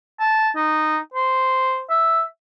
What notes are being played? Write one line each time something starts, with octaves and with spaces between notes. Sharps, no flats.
A5
D#4
C5
E5